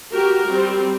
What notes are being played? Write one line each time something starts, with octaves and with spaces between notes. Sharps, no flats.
F#4 G4 A#4
G3 C4